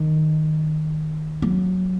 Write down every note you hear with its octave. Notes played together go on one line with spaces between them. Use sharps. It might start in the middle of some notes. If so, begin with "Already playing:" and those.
Already playing: D#3
F#3